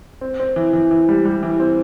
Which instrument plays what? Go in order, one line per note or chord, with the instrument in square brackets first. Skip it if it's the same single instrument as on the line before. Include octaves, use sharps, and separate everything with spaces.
[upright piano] C4
C4
E3
E3
E3
G3
G3
E3
C4